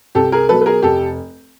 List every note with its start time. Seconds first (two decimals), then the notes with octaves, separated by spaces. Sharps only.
0.15 C2 G4 A4
0.32 G#4 A#4
0.49 B2 F#3 A4 B4
0.61 B4
0.66 G#4 A#4
0.82 F1 G4 A4